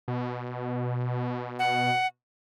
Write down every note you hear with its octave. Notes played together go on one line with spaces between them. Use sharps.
B2
F#5